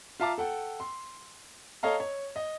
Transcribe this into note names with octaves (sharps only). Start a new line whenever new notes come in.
F4 E5 F5 A5 A#5 D6
A4 F#5 G5
C6
A4 C#5 D#5 F5 A#5
C#5
D#5